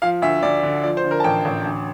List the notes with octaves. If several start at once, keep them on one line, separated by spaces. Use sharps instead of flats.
F3 F5
D2 E5
D2 D5
D3
F3 D5
C5
D3
A#4
A5
A1 G5
A1
D2